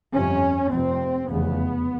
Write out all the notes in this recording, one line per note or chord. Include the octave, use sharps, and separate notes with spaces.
G1 F2 C3 C#4
F1 F2 C3 C4
F1 E2 C#3 B3